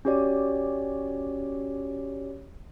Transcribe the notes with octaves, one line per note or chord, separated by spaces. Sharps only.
C#4 F#4 G4 C#5 D5